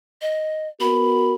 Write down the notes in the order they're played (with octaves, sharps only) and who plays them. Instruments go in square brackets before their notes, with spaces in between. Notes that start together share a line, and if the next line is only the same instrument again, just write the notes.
[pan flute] D#5
[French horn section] B3 F#4 A#4 [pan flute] B5